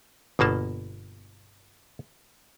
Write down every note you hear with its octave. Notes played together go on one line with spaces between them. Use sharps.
G1 B2 A#3 A5